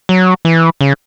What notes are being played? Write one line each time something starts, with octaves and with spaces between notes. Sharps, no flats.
F#3
E3
C#3